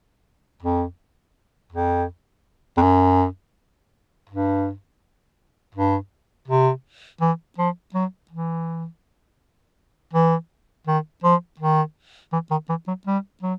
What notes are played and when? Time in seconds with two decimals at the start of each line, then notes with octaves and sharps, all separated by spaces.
0.62 F2
1.72 F2
2.77 F2
2.82 F#2
4.29 G2
5.75 G2
6.48 C3
7.21 E3
7.58 F3
7.94 F#3
8.31 E3
10.13 E3
10.87 D#3
11.24 F3
11.59 D#3
12.32 E3
12.51 D#3
12.69 E3
12.87 F#3
13.07 G3
13.43 F#3